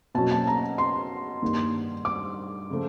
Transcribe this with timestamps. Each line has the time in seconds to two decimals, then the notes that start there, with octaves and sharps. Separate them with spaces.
0.15 B2 F#3 A#3 C#4 F#4 A5
0.32 A5
0.47 A#5
0.78 C6
1.42 G2 D#3 G3 A#3
2.05 D6
2.70 C#3 F3 A3